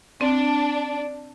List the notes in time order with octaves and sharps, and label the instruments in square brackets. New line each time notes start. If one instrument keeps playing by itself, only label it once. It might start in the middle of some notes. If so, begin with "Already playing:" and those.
[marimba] C4 [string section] D4